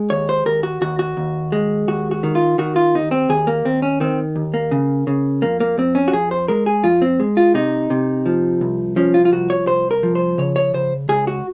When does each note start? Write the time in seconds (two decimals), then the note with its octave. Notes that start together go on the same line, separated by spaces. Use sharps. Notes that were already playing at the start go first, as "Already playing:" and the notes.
Already playing: G#3
0.10 D#2 C#5
0.29 C5
0.46 D#2 A#4
0.63 F#4
0.81 D#2 F#4
0.99 F#4
1.17 D#2
1.52 G#3
1.88 D#2 F#4
2.11 F#4
2.23 D#3
2.35 F4
2.58 D#3 F#4
2.76 F4
2.95 D#2 D#4
3.11 C4
3.29 D#2 G#4
3.47 A#3
3.65 D#2 C4
3.82 C#4
4.00 D#3 C4
4.36 D#2
4.54 A#3
4.71 C#3
5.07 C#3
5.42 F2 A#3
5.60 A#3
5.78 F2 C4
5.95 C#4
6.08 F#4
6.13 F2 G#4
6.31 C5
6.48 G#3 A#4
6.66 G#4
6.84 F2 F4
7.02 C4
7.20 G#3
7.37 F4
7.54 C3 D#4
7.90 C3
8.26 F3
8.61 C2
8.96 F3 C#4
9.14 F4
9.25 F4
9.32 C2 F#4
9.50 C#5
9.67 C2 C5
9.91 A#4
10.03 F3
10.15 C5
10.38 C#3 C#5
10.56 C#5
10.74 C#3 C5
11.09 C#2 G#4
11.27 F#4